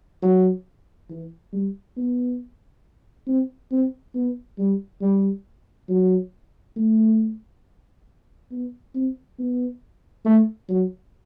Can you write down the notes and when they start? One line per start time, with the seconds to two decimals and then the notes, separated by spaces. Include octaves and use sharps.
0.22 F#3
1.09 E3
1.53 G3
1.97 B3
3.27 C4
3.71 C4
4.15 B3
4.59 G3
5.02 G3
5.89 F#3
6.76 A3
8.51 B3
8.95 C4
9.39 B3
10.25 A3
10.69 F#3